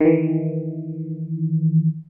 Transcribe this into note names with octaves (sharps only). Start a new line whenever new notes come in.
D#3 E3